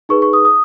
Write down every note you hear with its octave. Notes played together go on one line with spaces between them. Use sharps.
D#4 G#4 B4 C#6
C#6
D#6
D#6